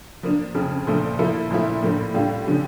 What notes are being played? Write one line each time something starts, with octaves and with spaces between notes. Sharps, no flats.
F3 A#3 D4
F2 C#3 F3
A#2 F3 A3 D4 A4
F3 A#3 E4 A4
A#2 F3 A3 E4
A2 F3 A#3 D4
A2 G3 D4 F4
D3 F3 C#4 G4